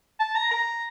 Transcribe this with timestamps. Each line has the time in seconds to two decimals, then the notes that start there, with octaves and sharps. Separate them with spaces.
0.20 A5
0.36 A#5
0.51 A#5